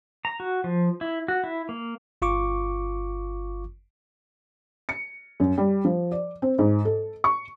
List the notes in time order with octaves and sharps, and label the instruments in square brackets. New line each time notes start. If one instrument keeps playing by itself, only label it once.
[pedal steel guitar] A#5
F#4
F3
E4
F#4
E4
A#3
[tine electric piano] G1 F4 C#6 D6
[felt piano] C#7
F#2
G3
F3
D5
C4
G#2
A4
C#6